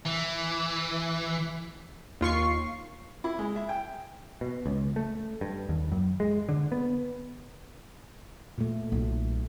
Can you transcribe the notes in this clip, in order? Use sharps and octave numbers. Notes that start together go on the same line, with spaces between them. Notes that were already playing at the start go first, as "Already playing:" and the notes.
E3
D#2 F4 C#6 C7
E4
G#3
E5
G5
B2
C#2
A3
G2
D#2
F#2
G#3
D3
B3
A#2 A3
B1